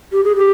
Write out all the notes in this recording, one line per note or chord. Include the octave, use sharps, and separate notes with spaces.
G4
G#4
G4